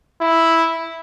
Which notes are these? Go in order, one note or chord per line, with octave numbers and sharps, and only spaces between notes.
E4